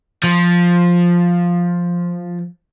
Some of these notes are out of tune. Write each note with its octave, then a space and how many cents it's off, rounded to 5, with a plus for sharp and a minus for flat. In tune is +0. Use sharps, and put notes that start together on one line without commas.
F3 +5